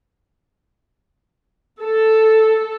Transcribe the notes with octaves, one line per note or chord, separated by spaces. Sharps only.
A4